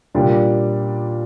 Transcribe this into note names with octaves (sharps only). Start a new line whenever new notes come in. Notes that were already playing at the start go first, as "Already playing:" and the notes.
A#2 G3 A#3 D4